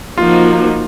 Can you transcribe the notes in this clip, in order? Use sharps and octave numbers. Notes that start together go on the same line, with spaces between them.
F3 A#3 D#4 F4 F#4